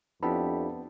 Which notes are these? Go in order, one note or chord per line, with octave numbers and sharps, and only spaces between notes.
F2 B3 D4 E4 G4 A5 B5